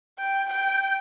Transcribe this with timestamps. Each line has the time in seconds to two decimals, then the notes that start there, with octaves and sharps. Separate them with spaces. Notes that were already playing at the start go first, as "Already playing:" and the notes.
0.19 G5
0.51 G5